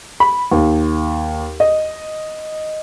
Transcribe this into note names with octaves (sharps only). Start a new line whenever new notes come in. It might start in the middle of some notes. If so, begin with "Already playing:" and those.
B5
D#2
D#5